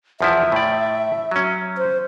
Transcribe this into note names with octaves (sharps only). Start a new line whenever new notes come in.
E2 F3 E4 E5
A2 D5
F#3 C#4
C5